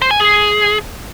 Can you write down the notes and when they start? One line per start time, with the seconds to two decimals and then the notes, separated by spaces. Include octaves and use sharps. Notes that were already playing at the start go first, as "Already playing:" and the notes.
0.02 C5
0.11 G#5
0.20 G#4